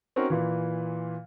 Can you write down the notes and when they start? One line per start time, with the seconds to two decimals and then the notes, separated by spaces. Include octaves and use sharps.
0.16 C4 C#4 D#4 F#4 A#4
0.30 A#2 E3